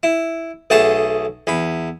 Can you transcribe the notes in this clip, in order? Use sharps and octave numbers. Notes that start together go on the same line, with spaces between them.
E4
B1 A3 G#4 F#5 A5
E2 B5